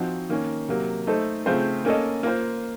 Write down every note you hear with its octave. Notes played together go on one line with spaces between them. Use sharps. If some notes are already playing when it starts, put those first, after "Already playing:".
Already playing: F3 C4 D#4 F#4
D#3 A#3 C#4
C3 F#3 A#3
A3 D#4 A4 C5
C#3 A3 C4 F4 C5
A#3 C#4 A4 D#5
A#3 F4 C5